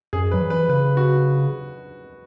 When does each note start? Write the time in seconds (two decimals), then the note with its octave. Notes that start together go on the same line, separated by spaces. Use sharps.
0.13 F#2 G#4
0.31 F#3 B4
0.41 E3
0.50 B4
0.69 C#3 B4
0.97 F#4